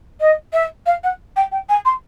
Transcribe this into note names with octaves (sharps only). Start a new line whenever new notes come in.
D#5
E5
F5
F#5
G5
G5
G#5
C6